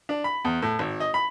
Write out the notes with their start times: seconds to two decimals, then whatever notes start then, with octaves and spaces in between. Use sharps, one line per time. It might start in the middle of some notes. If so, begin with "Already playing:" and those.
0.09 D4
0.24 B5
0.45 E2
0.62 A2
0.79 G#1
1.00 D#5
1.14 B5